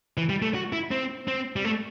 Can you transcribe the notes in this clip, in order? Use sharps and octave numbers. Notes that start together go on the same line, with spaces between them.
E3
G3
A3
F#4
E4
C4
C4
G3
A3